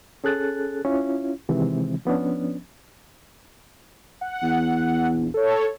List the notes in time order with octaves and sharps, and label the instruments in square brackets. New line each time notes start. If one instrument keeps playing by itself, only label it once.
[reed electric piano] C#4 G#4 A4 F#6 A6
C#4 E4 F4
C3 D#3 E3 G#3 C4
F3 B3 C#4 D4
[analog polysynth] F#5
[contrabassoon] E2
[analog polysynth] A#1
A4 C#5